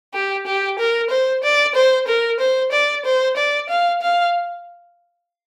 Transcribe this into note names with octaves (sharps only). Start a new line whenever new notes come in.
G4
G4
A#4
C5
D5
C5
A#4
C5
D5
C5
D5
F5
F5